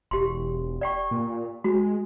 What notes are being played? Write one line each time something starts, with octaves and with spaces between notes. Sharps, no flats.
E1 G4 C6
D5 G5 C#6
A#2
G#3 F#4